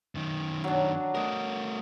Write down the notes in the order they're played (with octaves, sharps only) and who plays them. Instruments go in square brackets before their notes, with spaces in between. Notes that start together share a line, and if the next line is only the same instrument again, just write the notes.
[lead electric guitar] F#2 D#3
[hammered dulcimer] F#3 D4
[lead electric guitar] A3 A#4 [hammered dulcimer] D#5